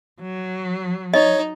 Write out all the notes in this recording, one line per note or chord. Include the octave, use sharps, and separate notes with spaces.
F#3
D#4 C#5 D#5